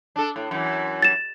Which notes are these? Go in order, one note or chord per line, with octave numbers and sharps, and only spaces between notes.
D4 A4
A2
F#2 E3
A6 E7